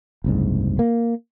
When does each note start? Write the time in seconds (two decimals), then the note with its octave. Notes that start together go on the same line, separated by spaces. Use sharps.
0.24 F#1 C2 G#2
0.79 A#3